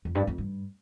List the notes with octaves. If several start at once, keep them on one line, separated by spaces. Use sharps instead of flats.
F2
G2
F2
G2